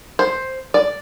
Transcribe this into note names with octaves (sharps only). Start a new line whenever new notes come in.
C5
D5